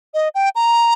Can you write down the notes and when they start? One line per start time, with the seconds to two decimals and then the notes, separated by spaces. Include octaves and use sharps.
0.14 D#5
0.35 G5
0.55 A#5